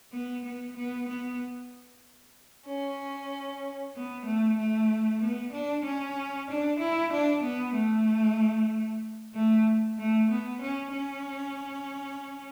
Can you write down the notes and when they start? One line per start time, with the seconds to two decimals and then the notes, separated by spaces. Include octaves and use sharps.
0.12 B3
0.44 B3
0.75 B3
1.07 B3
2.65 C#4
3.94 B3
4.24 A3
4.57 A3
5.20 B3
5.52 D4
5.84 C#4
6.48 D4
6.79 E4
7.11 D4
7.42 B3
7.75 A3
9.34 A3
9.98 A3
10.29 B3
10.61 C#4
10.93 C#4